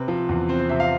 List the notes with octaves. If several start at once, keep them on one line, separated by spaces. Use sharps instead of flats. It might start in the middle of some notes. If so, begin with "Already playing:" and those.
Already playing: C3 C4 B4
F3
E2
C4 C5
C5
C3 E5
F5